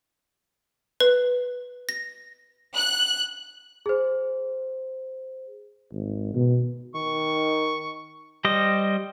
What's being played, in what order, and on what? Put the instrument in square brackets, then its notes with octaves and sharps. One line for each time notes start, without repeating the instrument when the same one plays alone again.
[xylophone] B4
A#6
[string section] F#6
[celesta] G#4 C5
[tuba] G#1
B2
[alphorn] D#3 [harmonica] C#6
[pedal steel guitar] G3 C5 D#5